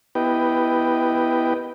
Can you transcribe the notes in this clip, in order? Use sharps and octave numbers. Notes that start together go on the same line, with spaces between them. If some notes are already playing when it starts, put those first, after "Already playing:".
B3 E4 G4 B4 D#5 G5